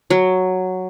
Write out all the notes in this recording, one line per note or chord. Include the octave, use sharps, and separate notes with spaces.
F#3